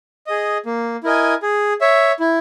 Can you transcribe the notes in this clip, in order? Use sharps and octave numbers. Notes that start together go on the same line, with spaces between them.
G#4 D#5
A#3
E4 A#4 D#5 G#5
G#4
C#5 E5
E4